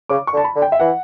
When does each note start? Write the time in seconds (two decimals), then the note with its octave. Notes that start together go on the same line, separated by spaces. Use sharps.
0.09 C#3 D6
0.27 C#6
0.33 D3
0.37 A5
0.44 B5
0.56 D3
0.62 G5
0.72 E5
0.80 E3 F#5